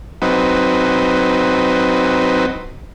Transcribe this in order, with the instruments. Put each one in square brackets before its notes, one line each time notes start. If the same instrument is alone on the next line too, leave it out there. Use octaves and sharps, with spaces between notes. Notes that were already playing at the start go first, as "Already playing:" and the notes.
[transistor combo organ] F#3 C4 D#4 B4